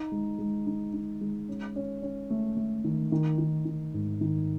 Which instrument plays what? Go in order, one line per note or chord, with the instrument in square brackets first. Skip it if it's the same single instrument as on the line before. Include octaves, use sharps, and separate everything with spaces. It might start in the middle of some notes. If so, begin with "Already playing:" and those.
Already playing: [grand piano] D#4
G#3
G#3
D#4
D#4
G#3
C#4
C#4
C#4
A3
A3
D#3
D#3
D#3
D#3
G#2
D#3